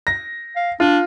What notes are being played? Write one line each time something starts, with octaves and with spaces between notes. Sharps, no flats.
A#6
F5
D4 F4